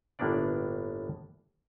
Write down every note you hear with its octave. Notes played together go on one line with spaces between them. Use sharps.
G1 A2 A#3 B3 D4 D5